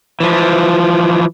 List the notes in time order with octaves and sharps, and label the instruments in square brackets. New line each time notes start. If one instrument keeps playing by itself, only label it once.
[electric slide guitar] E3 F3